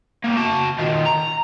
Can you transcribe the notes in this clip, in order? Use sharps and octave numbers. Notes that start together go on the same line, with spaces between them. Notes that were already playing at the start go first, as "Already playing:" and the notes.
G3 A#3
F#4 A5
D#3 F4
A#5